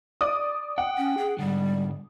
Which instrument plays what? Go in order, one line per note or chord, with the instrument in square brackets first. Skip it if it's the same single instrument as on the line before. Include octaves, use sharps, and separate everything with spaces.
[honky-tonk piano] D5 D6 D#6
[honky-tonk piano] F#5 [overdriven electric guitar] G5
[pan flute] C#4
G#4
[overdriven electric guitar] G#2 D3 [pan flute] G3